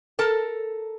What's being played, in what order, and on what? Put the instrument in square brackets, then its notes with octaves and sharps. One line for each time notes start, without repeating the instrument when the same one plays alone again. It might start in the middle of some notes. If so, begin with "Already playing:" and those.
[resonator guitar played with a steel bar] A4 A#4 A5